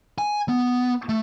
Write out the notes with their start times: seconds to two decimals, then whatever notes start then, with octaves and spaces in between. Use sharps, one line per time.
0.18 G#5
0.49 B3
1.09 A3